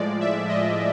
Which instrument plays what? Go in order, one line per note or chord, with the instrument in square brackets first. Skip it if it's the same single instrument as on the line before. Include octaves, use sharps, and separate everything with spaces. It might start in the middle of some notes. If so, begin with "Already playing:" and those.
Already playing: [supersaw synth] A2 F3 G#3 D5
E5
D#5